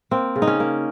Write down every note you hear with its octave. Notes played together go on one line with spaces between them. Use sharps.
A#3 C4
C#3
D#4
C#4
A#3